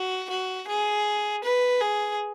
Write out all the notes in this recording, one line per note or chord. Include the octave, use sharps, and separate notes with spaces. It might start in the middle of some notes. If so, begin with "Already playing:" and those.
Already playing: F#4
F#4
G#4
B4
G#4